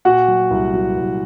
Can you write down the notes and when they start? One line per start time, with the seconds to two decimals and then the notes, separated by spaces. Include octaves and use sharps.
0.05 A#2 F#4 F#5
0.28 F#3
0.51 C2
0.73 F#3
0.97 C2